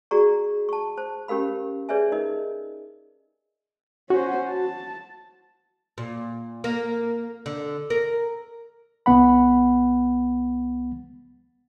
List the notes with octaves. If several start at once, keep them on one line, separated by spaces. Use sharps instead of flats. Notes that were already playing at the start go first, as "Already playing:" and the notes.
F#4 G#4 D5 A#5 C#6
A5 C#6
C5 A5
C#4 G4 A#4 F5 B5
G#4 B4 C#5 D5 E5 G#5
D#4 A#4 D#5
C#4 F#4 C5
A5
A#2
A#3
D3
A#4
C2 B3 F#5 B5